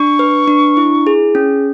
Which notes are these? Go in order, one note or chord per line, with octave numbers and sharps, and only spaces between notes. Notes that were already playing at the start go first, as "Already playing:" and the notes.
Already playing: D4 C#6
B4
D4
E4
G#4
C#4